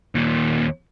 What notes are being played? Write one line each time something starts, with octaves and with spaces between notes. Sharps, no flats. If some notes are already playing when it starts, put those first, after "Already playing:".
D#2 A#2